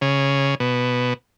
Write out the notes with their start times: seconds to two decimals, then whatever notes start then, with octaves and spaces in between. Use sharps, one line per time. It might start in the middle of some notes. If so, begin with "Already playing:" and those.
0.01 C#3
0.60 B2